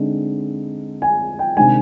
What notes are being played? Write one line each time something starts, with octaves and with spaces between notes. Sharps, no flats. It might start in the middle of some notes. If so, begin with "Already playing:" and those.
Already playing: D3 G#3 C4 D#4
G#5
G5
C3 D#3 G#3 D4 G#5